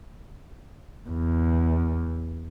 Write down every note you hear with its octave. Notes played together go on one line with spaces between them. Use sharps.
E2